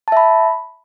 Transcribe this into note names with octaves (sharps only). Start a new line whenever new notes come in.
E5 A5 B5